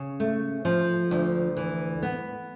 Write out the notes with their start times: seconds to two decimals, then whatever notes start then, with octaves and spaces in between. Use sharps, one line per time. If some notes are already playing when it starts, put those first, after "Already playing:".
Already playing: C#3
0.20 A3
0.65 F3
1.11 D2
1.57 E3
2.02 B3